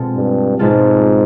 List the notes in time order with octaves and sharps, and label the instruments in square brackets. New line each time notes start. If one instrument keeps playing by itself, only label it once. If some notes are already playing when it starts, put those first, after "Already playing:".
Already playing: [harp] B2 G#3 C4 F4 A4
[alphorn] G2
[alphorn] G#2 [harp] B2 G#3 C4 F4 A4